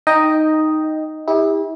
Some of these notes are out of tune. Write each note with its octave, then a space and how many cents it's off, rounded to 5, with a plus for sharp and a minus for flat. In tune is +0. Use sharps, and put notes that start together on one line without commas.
D#4 +0 D#5 +0 G5 +0
E4 -35 G4 +35